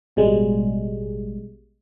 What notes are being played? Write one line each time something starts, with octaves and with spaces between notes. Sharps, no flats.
A1 B2 G3 G#3